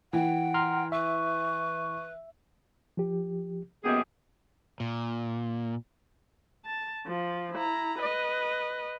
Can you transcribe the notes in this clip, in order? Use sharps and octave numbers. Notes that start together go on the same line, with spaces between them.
E3 F#5 G5
A#5 C6 F6
B4 E5 C#6
F3 G4
F#2 A#3 B3 G4 G#4 D#5
A#2
A5
F3 F4
E4 A#5
B4 D#5